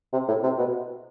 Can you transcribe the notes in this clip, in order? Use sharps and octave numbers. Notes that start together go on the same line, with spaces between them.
C3
A2
C3
B2